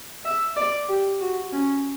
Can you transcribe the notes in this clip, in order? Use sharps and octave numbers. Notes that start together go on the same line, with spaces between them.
E5
D5
G4
F#4
C#4